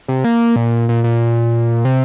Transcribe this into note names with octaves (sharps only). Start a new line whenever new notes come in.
C3
A#3
A#2
A#2
A#2
C3